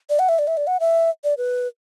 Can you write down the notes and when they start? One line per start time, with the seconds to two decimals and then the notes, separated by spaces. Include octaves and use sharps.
0.10 D5
0.19 F#5
0.29 E5
0.39 D5
0.47 E5
0.57 D5
0.67 F#5
0.80 E5
1.24 D5
1.38 B4